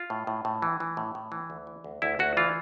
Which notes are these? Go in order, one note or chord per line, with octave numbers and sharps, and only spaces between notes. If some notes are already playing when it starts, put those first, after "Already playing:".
Already playing: F4
A2
A2
A2
E3
E3
A2
A2
E3
D2
E3
D2
D2 E4
D2 F#4
E3 F4